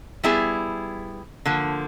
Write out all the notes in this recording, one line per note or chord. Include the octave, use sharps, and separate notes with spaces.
G3 B3 E4 G#4
D3 F3 A#3